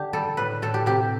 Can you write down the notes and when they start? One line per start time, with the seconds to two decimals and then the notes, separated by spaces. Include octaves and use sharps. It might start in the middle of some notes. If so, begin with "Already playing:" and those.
Already playing: D3 D4 G4
0.13 G3 A4
0.37 A2 B4
0.62 A2 A4
0.74 G4
0.86 C3 G4